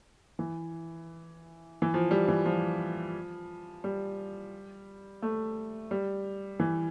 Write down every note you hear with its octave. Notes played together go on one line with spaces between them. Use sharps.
E3
E3
F3
G3
E3
F3
G3
A3
G3
E3